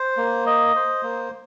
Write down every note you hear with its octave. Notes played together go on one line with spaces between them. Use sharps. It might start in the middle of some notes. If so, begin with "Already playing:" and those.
Already playing: C5
A#3
D#5
C5
A#3